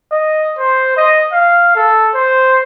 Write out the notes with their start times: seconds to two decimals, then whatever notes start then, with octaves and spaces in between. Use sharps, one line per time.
0.12 D#5
0.58 C5
0.97 D#5
1.32 F5
1.76 A4
2.14 C5